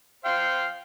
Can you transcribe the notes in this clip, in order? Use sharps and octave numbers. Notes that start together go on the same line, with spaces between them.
C5 F5 G5